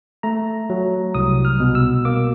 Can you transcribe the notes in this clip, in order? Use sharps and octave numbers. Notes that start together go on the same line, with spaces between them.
A3 A#5
F#3
C2 D#6
F6
B2
E6
A#3 D6